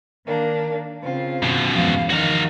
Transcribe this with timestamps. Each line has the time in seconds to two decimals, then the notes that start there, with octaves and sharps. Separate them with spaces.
0.25 D#3 A#3 D4
1.02 C#3 C4 F4
1.43 F#2 B2
1.73 E2 G#2 F3 F5
2.10 D#3 D#4 F#4 F5